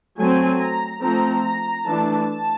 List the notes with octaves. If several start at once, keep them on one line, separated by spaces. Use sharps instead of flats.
F#3 A3 C4 G#5
A#5
F3 A3 C4 A#5
A#5
E3 A3 D4 A5
A5